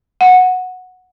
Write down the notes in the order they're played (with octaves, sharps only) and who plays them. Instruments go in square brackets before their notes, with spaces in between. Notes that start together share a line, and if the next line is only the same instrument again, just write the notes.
[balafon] F#5